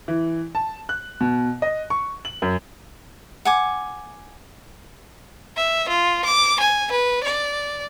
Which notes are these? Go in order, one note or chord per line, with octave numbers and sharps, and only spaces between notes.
E3
A5
F#6
B2
D#5
C#6
F#7
F#2
F#5 G#5 D6
E5
F4
D6
G#5
B4
D5